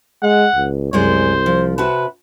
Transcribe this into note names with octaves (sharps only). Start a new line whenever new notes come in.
G#3 F#5
C#2
C2 F#2 G#3 C5 D5
F3
C3 F#4 B4 A5